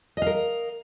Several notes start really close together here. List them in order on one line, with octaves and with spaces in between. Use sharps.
D#5 F5 A#4